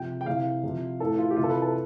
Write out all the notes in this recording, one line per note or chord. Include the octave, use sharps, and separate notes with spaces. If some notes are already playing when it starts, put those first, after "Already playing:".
Already playing: C3 F3 G5
G5
C3 E3 F5
C3 F3
A2 E3 A4
F4
G4
C3 F4
E3 A4
B4
A4